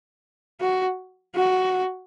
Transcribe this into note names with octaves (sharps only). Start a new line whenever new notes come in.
F#4
F#4